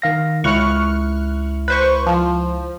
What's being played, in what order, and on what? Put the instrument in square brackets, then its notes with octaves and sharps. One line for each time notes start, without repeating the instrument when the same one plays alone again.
[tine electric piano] D#3 F5 A#6
[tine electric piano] C#2 E4 C#7 [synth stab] C#6 F6 F#6
[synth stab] B4 C5 C#6
F3